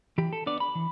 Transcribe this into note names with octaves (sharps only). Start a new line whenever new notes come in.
E3 G4
A4
B3 D4 D5
B5
E3